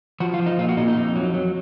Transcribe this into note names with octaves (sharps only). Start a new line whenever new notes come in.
F3 F#4
F4
F3
D#4
A#2 F4
F#4
A#2 D#4
D#4
F2
F#3
F#3